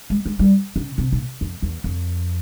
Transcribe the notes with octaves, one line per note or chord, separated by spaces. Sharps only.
G#3
G#3
G3
C#3
C3
A#2
F2
E2
F2